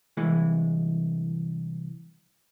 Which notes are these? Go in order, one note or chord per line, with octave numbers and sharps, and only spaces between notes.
C2 E3 G#3